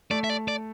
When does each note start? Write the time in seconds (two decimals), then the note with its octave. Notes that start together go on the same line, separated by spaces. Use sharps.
0.10 A3 D5
0.24 E5
0.30 D5
0.48 D5